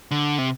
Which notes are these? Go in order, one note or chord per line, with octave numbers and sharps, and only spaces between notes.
D3
C3